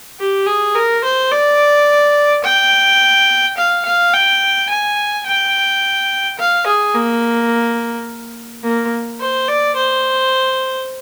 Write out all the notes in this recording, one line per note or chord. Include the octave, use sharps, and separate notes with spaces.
G4
G#4
A#4
C5
D5
G5
F5
F5
G5
G#5
G5
F5
G#4
A#3
A#3
C5
D5
C5